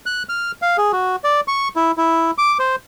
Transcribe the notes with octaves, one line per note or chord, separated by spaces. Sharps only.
F#6
F6
F5
G#4
F#4
D5
C#6
E4
E4
D6
C5